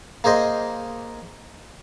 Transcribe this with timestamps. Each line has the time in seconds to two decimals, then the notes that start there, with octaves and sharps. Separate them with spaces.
0.24 A#3 G#4 C5 D#5